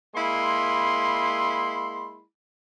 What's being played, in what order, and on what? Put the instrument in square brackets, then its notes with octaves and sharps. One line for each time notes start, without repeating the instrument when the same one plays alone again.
[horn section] G#3 A#3 E4 B5 C6